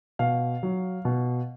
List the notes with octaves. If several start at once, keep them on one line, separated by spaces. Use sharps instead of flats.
B2 F5
F#3
B2